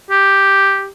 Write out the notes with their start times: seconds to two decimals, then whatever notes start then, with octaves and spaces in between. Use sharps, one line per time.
0.10 G4